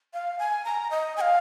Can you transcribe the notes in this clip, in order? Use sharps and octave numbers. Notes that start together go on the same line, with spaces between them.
F5
G#5
A#5
D#5
G#5
F5